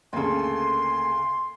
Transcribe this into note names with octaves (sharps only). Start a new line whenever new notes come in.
D2 C#3 A#3 A4 C6